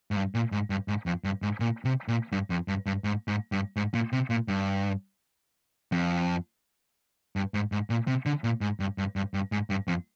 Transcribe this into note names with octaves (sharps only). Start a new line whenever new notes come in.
G#2
G2
A#2
G#2
G2
G#2
F2
G2
G#2
A#2
C3
A#2
G2
F2
G2
G2
G#2
G#2
G2
G#2
A#2
C3
A#2
G2
F2
G2
G#2
G#2
A#2
C3
D3
A#2
G#2
G2
G2
G2
G2
G#2
G2
F2